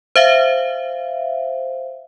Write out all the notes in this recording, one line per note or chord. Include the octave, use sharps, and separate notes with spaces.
C5 E5 F5